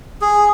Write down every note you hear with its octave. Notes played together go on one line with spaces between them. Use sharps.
G#4